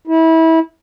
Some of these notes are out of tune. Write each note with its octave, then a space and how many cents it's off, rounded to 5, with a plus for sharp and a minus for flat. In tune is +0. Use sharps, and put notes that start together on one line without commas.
E4 -25